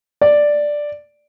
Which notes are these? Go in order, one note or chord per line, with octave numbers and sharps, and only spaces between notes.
D5